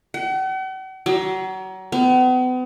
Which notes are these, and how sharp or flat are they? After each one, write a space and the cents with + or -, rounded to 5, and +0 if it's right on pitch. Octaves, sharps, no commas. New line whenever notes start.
F#5 +45
F#3 +30
B3 +40